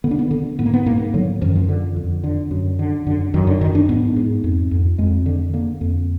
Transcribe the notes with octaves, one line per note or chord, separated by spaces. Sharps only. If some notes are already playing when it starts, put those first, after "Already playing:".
D3 B3
D4
B3
D3
G#2 B3
A#3
B3
G#2 A#3
D3 F#3
F#2 F3
D#3
F3
D3
F2
D3
F#2
D3
F#2 D3
F#2 D#3
D3
F#2 D#3
D4
G#2 B3
G#2
F2
F2
F2 G#3
D3
D3 A#3
F2